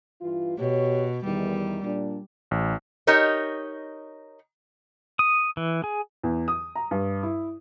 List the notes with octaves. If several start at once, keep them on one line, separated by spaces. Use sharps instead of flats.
G2 E3 F4
B2 G4 C#5
E2 D#3 G3
A#2 D4
A1
D#4 G4 A#4 C#5 D#5
D#6
E3
G#4
E2
D#6
A#5
G2
E4